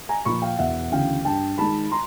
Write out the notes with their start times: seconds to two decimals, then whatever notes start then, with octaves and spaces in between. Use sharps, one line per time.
0.09 G#5 A#5
0.25 A#2 F3 B5 C#6
0.42 F5 G5
0.59 E1 E5 F#5
0.92 D2 C#3 E3 F5 G5
1.25 G2 G5 A5
1.58 D#3 G#3 A5 B5
1.92 A#5 C6